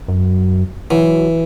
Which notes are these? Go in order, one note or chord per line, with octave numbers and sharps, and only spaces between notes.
F#2
E3 F#3